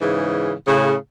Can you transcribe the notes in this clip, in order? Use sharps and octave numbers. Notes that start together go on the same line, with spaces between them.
G#2 C#3 E3
A2 C#3